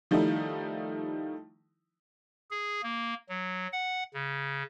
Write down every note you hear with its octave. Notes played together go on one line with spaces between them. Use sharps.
D#3 F3 G3 A3 D#4 E4
G#4
A#3
F#3
F#5
C#3